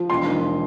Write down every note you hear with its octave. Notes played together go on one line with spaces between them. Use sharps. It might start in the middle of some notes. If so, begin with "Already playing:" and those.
Already playing: F3
E1 C6
D#2